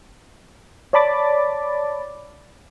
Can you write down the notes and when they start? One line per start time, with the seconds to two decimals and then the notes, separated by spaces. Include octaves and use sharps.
0.93 C#5 D5 A5 B5 D6 A6